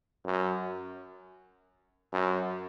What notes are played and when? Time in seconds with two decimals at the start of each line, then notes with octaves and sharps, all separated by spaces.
0.25 F#2
2.13 F#2